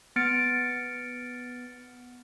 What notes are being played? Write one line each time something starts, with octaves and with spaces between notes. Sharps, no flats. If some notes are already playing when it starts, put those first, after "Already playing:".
B3 F6 A6 C#7 D7